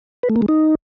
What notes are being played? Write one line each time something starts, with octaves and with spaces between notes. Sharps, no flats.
B4
A3
A#3
G#3
D#4